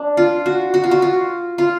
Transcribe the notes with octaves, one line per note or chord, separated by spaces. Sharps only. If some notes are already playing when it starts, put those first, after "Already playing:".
Already playing: D4
F4
F#4
F#4
F4
F#4
F4
F4